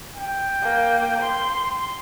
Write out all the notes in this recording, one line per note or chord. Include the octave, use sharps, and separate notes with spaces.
G5
A#3
C6